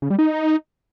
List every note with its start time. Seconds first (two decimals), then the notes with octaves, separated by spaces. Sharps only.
0.02 C#3
0.10 G3
0.19 D#4